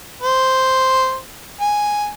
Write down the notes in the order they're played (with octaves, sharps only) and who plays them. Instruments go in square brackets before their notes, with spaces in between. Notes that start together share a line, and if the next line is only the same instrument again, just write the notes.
[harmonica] C5
G#5